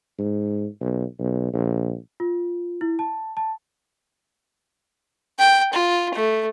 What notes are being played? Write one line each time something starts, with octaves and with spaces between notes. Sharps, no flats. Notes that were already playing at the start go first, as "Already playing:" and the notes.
G#2
B1
B1
A#1
F4
E4
A5
A5
G5
F4
A3